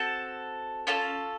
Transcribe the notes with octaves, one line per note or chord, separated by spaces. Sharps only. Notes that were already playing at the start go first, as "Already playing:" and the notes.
Already playing: C4 F#4 A4 A5
C#4 F4 A4 A5